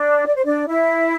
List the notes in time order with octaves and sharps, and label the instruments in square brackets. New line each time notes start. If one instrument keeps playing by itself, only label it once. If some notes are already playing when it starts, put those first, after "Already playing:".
Already playing: [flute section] D4
D5
C5
D4 D5
E4 E5